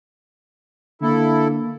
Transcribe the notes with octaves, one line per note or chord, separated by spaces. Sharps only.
D3 A#3 E4 A4